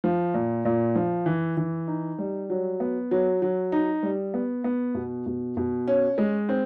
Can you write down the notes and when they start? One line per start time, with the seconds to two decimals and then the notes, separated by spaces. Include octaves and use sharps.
0.04 F3
0.34 A#2
0.65 A#2
0.96 F3
1.26 E3
1.57 E3
1.87 D#4
2.18 G3
2.50 F#3
2.80 B3
3.11 F#3
3.42 F#3
3.72 D#4
4.03 G3
4.34 B3
4.64 B3
4.95 B2
5.26 B2
5.57 B2
5.87 C#4
6.18 G#3
6.49 C4